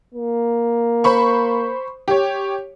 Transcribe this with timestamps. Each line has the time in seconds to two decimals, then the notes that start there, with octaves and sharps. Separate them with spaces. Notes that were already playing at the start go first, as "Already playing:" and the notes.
0.14 A#3
1.04 C5 B5 C#6
2.08 G4 C#5